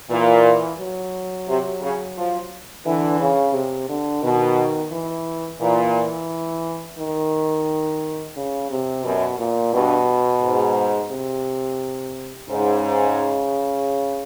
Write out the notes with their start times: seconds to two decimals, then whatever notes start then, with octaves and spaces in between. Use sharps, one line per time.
0.10 A#2 E3
0.79 F#3
1.48 C3
1.82 C#3
2.17 F3
2.85 D3 E3
3.20 C#3
3.54 C3
3.89 D3
4.23 B2 D#3
4.92 E3
5.61 A#2 E3
6.98 D#3
8.36 C#3
8.71 C3
9.04 F#2 B2
9.39 A#2
9.73 G2 B2
10.42 G#2
11.11 C3
12.49 G#2 C#3